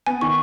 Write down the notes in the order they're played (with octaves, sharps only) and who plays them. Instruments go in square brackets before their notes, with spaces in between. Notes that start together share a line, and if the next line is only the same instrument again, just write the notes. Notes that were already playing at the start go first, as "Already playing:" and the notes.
[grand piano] B3 [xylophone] G#5
[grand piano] D#3 [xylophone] C#6